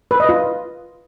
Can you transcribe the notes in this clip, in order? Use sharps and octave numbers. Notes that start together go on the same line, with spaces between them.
B4
D#5
F4